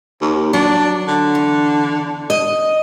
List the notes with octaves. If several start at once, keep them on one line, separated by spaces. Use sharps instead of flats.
D#2
F#3 D4
D3
E2
D#5